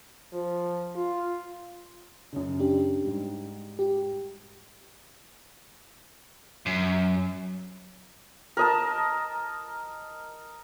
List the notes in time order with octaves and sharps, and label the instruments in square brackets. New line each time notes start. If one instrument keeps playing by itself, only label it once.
[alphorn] F3
F4
[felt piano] F#2 C#3
[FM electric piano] D4 G4
[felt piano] G#2 G3
[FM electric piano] G4
[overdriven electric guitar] F#2
[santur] A#4 D#5 A5